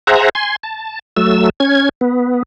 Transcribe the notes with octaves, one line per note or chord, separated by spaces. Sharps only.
G#4 C5 E5 F#5 A#5
G#5 C6
A5
F#3 A3 E6
C#4 G#6
B3